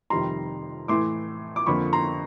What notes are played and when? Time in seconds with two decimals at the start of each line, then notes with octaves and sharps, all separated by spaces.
0.10 F2 C3 D#3 G3 A#5 C6
0.88 A2 E3 A3 C6 D6
1.56 D6
1.66 F2 D3 F3 A#3 B5 C#6
1.93 A#5 C6